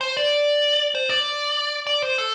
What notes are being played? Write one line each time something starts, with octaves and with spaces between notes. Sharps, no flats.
C5
D5
C5
D5
D5
C5
A4